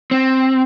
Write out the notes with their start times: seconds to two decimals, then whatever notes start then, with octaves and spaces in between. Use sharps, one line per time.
0.11 C4